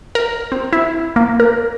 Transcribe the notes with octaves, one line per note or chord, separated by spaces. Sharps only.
A#4
C4
E4
A#3
A#4